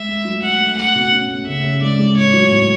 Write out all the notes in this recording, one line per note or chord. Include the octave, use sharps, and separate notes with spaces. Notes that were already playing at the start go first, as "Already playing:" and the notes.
Already playing: G#3 E5
A3
F#3
A3 F#5
A3
A3 F#5
B2
C#4
A3
C#3 E5
C#3
G#3 D5
G#3
A2 C#5
F#3
A2